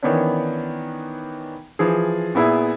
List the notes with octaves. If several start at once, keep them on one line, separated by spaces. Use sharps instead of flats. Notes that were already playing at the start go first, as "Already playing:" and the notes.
D#3 E3 B3 C#4 D4
E3 F3 G#4
A#2 B3 E4 G#4